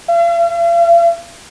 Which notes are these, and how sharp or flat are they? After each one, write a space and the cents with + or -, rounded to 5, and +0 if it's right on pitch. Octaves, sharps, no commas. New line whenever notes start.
F5 -45